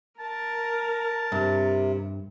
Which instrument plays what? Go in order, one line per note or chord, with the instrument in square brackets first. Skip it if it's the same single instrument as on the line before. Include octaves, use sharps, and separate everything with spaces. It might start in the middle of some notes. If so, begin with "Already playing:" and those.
[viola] A#4 [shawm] A5
[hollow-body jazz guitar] G2 [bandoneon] C3